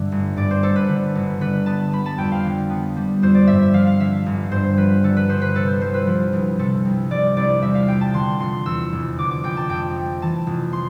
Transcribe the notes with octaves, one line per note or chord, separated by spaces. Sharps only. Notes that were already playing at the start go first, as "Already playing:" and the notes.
Already playing: G2 D3 A3 E5
G1
G2 D5
C5
A3 A4
B4
D3
G1
D3 B4
B3 A5
G3 B5
A5
F2 G5
F5
D3
B3
G3
F2 C5
D5
G2 E5
E5
F3 F5
F5
D3 E5
G1
G2 C5
F3 B4
D3 A4
B4
G1 C5
B4
C3 A4
C5
C2 C5
B4
F3
C2
C3 A4
C2
F3 D5
C2 D5
E2 E5
F5
F1 G5
A5
D3 C6
F1 C6
E2 E6
F1
D3 D6
D6
F1 G5
A5
F2 G5
A3
E3 A5
F1
C6